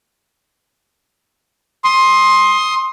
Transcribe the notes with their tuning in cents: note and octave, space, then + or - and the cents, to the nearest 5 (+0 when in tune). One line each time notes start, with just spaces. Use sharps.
C6 +15 D#6 +10